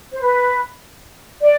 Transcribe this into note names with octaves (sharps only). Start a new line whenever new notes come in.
C5
B4
D5